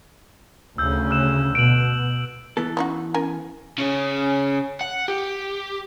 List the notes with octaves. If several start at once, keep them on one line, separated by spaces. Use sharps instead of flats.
D2 C#3 E6 G6
E6 F#6 E7
B2 D7 F#7
E3 B3 A4
C#4 D#4 F#4
C#4 A#4 G#5
C#3 C#4
F#5
G4